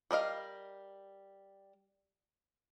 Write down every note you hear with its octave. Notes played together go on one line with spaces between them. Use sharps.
G3 A#4 D#5 F5